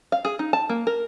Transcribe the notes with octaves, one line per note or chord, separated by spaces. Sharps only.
F5
G#4
D#4
A5
A#3
A#4